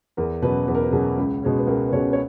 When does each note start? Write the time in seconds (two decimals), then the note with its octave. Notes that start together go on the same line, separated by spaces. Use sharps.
0.17 E2 A#4
0.42 B2 F#3 C#4 B4
0.68 E2 B4
0.75 A#4
0.83 B4
0.92 B2 F#3 C#4 G#4
1.18 C#2
1.43 B2 G#3 C#4
1.58 B4
1.67 C#2 A#4
1.88 B4
1.93 B2 G#3 C#4 C#5
2.13 C#5